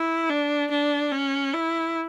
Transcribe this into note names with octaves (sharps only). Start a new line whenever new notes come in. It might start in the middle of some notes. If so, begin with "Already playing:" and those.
Already playing: E4
D4
D4
C#4
E4